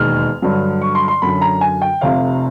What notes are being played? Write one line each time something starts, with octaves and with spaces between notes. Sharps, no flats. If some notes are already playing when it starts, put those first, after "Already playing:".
Already playing: E1 D#2 D#3 G#3 F6
G2 D3 F#3
C#6
C6
C6
F#2 D3 F#3 B5
A#5
G#5
G5
F1 F2 C3 F5